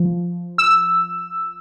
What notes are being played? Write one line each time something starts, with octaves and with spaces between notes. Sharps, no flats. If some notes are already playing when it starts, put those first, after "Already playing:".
Already playing: F3
E6